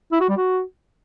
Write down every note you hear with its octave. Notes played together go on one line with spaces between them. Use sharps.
E4
F#4
G3
F#4